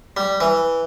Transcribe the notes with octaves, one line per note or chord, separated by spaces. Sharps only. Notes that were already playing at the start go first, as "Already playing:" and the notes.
G3
E3